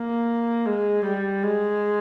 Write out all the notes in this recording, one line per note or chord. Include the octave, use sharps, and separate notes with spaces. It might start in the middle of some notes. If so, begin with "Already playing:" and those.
Already playing: A#3
G#3
G3
G#3